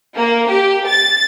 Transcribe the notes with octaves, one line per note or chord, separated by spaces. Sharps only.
A#3
G4
A6